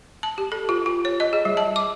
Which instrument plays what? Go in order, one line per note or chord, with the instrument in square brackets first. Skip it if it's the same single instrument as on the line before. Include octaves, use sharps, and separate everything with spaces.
[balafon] A5
G4
A4
F4
F4
C#5
D#5
G#4
G3
A5
D6